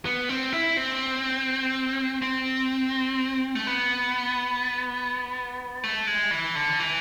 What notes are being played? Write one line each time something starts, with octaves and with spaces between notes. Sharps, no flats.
B3
C4
E4
C4
C4
A3
B3
A3
G#3
E3
D3
E3